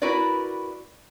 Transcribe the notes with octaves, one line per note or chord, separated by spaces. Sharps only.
E4 F#4 A#4 B4 D5